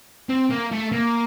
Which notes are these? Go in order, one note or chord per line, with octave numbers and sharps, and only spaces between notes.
C4
A#3
A3
A#3